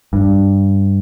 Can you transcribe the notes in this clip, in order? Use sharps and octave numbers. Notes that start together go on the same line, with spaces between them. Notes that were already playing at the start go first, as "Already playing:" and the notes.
G2